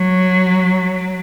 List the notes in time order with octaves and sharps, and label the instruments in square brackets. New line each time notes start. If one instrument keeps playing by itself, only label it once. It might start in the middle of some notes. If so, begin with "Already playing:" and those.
Already playing: [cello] F#3